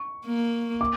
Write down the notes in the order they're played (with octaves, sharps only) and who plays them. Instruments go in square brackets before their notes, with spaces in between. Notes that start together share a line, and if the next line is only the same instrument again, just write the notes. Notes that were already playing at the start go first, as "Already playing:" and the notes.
Already playing: [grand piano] C#6
[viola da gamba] A#3
[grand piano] D6